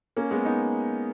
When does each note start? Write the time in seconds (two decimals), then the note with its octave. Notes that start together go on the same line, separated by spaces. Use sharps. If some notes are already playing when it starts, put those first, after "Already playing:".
0.17 A#3 C#4
0.31 G#3 B3
0.45 B3 D#4